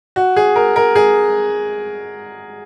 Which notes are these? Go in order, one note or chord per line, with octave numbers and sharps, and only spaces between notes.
F#4
G#4
A#4
A#4
G#4